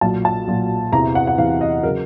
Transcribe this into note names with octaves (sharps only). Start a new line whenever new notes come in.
B1 A#2 F#3 A5
A5
B1 A#2 F#3
E2 C3 E3 A#5
F#5
F#5
E2 C3 E3 F5
D#5
C#3 F#3 A#4